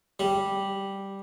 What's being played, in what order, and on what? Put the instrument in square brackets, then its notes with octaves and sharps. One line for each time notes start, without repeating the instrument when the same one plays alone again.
[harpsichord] G3